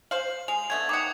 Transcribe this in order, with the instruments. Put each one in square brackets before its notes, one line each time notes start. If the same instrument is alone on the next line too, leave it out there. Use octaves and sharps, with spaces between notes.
[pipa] C5 F5 [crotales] F#7
[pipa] G#3 [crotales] F7
[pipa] D3 A3 B3 [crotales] G#6
[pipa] D#3 F#5 [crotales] D6 D#6 C#7